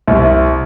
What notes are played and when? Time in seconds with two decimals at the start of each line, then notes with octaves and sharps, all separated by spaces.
0.07 C2